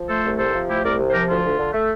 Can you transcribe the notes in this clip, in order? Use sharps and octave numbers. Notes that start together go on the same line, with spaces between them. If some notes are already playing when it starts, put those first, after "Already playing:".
Already playing: F3
A3 A4 C5
C2
C3 A4 C5
F3
A3 E4 G4
C2 A#4 D5
C3
C5
F3 G4 A#4
D2 F4
D2
D3
A3